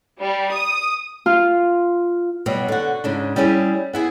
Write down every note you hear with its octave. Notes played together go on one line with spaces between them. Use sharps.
G3
D#6
F4
B2 F#3 G3
D3 F#4
G#2 C#3 D4
G3 C#4 E4 G#4
B3 E4 G#4